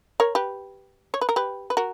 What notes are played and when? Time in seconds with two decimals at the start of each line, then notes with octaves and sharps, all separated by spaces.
0.20 A#4 C#5
0.35 G4 B4
1.14 C#5
1.21 B4
1.29 A#4
1.36 G4 B4
1.70 B4
1.77 F#4 A#4